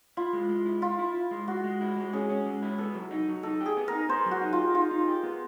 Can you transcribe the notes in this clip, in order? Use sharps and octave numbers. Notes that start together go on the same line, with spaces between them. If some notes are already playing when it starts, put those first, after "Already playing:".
E4 F4
G#3
G#3
E4
E4 F4
E4
E4
G#3
G#3 F#4
G#3
E4
G#3
C#4 G#4
C#4
G#3
E4
B3 A4
F#3
D#4
F#3
D#4 A4
G4
G#4
B3
D#4 A#4
B3 C5
F#3
F#4
D#4
F4
G4
D#4 F4
D#4
G4
B3